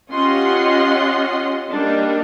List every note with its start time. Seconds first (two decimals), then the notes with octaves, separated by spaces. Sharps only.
0.12 C#4 F4 G4 D#5 F#5 C6
1.71 G3 A#3 D4 D#4